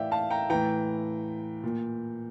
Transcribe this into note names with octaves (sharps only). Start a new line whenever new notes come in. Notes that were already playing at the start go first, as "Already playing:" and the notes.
Already playing: A2 E3 D5 E5 F5 G5
F5 A5
G5 A#5
A2 E3 G5 A#5
A#2